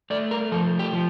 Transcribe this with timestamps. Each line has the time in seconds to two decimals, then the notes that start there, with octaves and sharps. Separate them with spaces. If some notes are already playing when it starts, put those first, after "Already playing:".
0.10 A3 D5
0.31 A#4
0.52 F3 A4
0.79 G4
0.93 F3